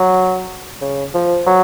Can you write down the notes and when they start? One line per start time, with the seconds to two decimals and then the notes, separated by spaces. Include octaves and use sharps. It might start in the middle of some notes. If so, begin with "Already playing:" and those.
Already playing: F#3
0.81 C#3
1.14 F3
1.47 F#3